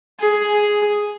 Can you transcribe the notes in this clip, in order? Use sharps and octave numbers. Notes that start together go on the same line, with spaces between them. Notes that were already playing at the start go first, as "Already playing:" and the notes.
G#4